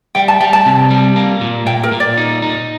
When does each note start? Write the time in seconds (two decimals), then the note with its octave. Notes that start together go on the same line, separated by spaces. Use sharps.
0.15 G3 G5
0.28 A5
0.40 G3 G5
0.53 A5
0.66 C3
0.90 G3
1.16 A#3
1.41 A#2
1.66 A#2 G5
1.83 A#4
1.92 A#2
2.00 D5
2.17 D#4
2.42 D#4